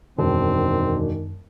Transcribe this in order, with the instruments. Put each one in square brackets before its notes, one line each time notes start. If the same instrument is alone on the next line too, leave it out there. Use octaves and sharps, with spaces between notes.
[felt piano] E1 [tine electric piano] F#2 [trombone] D#3 [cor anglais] C4